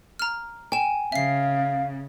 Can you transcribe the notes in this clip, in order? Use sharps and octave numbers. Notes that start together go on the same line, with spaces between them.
A#5 F6
G5 G#5 E7
C#3 E5 F5 C7